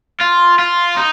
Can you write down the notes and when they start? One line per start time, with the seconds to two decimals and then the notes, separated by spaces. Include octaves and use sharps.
0.21 F4
0.59 F4
0.97 D#4